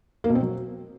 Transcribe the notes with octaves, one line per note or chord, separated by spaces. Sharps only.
A#3
B2
C4
F#3